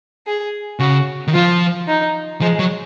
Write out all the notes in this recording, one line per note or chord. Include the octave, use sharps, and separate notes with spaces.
G#4
C#3 F#4
D#3
F3 F4
D#4
F3 G#3
F#3